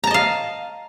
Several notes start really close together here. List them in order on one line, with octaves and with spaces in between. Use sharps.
A#5 A5 D#5 F5